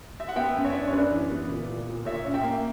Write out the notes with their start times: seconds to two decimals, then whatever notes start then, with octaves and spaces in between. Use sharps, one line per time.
0.20 E5
0.29 F#5
0.36 B3 E5 G5
0.55 F#2
0.65 C#5 E5
0.74 D4
0.88 C#5
0.92 F#2 B4 D5
1.11 E3
1.30 B3
1.49 A#2
1.68 A#2
1.87 A#2
2.05 A#2 C#5 E5
2.25 C#4
2.34 E5 G5
2.43 A#3